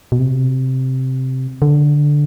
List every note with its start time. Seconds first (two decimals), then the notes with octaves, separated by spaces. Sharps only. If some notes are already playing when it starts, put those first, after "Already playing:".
0.12 B2
0.19 C3
1.62 D3